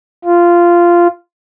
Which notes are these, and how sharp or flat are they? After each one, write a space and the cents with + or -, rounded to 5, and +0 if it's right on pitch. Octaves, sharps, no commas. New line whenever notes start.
F4 -10